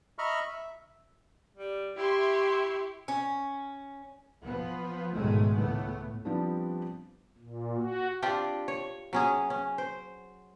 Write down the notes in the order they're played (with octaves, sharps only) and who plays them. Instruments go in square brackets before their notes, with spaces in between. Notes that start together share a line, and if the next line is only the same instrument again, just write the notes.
[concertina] D#5 E5 A#5 B5 C#6 F6
E5
[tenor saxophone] G3
[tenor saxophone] E4 [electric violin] G4 [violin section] E5 C6 C#6
[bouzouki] C#4
[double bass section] F3 B3
B1 G#2 D#3 G#3 A3
C#2 A2 A3 B3
[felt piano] F3 G3 B3 C4 D4 G4
[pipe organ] A#2
F#4
[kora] C4 D4 F4 G4
C#5
F#3 C#4 G#4
C#4
C5